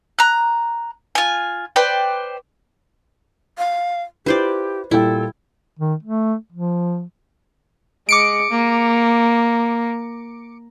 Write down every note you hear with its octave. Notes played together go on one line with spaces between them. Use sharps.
A#5 F#6
F4 G#5
B4 C5 D5 G5
F5
E4 F4 G4 B4 C5 D5
A#2 G3 E4 A4 G5
D#3
A3
F3
G#3 D6 C#7 D7
A#3